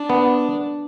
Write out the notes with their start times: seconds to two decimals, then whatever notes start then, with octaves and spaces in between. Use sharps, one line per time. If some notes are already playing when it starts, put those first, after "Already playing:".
Already playing: D4
0.10 B3